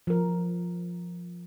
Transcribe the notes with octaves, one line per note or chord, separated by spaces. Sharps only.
F3 A#4